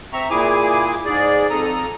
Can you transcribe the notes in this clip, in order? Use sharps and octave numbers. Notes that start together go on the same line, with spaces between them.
C4 E5 A#5 C#6
A#2 E4 G#4 G#5 D6
G#2 G#4 D5
F2 A4 A#5 D#6